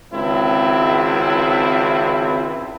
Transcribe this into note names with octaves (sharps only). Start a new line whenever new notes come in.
G#1 C#2 C4 E4